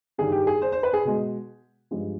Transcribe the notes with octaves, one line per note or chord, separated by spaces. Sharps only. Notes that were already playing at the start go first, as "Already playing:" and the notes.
G2 D#3 G3 G#4
G4
G#4
C5
C5
B4
G#4
B2 G#3
G2 F3 G#3